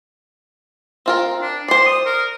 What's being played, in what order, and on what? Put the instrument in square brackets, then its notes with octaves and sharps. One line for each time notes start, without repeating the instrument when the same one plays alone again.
[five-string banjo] C4 F4 A#4
[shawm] D4
[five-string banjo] C5 D5 [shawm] C6
[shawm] D#6
A#4